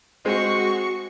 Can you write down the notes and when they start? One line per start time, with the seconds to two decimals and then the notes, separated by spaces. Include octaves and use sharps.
0.25 G#3 C4 F#4 G#4 C#6